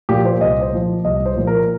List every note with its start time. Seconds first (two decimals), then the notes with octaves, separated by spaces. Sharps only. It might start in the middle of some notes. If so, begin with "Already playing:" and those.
0.09 A#2 F3 G4
0.25 C5
0.41 C2 D#5
0.61 C5
0.72 A#2 F3
1.05 C2 D#5
1.26 C5
1.36 A#2 F3
1.47 A#4